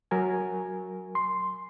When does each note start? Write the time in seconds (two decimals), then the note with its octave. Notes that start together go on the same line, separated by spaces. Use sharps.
0.11 F#3 A#4 G#5
1.15 C6